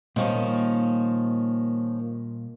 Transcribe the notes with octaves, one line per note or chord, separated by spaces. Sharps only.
A#2 D#3 F3 G3 A#3 C#4